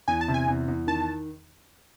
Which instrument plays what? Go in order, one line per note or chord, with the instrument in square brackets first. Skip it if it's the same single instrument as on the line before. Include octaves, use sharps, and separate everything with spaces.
[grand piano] E2 [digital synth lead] G#5
[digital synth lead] A5
[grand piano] C3
[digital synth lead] G#5
[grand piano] E2
E2
[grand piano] D#3 [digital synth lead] A5